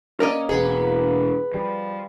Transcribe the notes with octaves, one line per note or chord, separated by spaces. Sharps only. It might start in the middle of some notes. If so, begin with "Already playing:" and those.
A#3 C#4 A#4 D5 D#5
E1 B3 G#4
F3 G3